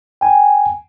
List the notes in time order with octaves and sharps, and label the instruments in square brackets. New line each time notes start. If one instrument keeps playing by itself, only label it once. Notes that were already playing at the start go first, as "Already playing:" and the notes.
[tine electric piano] G5 G#5